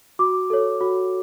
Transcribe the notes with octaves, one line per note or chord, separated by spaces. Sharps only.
F#4 D6
A4 C#5
F#4